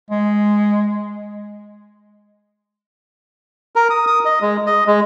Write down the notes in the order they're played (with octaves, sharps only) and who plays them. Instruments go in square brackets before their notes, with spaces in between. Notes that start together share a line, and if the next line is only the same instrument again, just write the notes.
[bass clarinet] G#3
[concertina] A#4
D#6
D#6
D#5
G#3
D#5
G#3